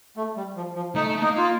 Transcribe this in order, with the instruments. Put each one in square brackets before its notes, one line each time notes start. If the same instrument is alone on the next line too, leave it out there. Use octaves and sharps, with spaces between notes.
[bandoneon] A3
G3
F3
F3
[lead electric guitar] A3 [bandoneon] D#4
[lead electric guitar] A3
[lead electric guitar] A#3 [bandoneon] D#4
[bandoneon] F4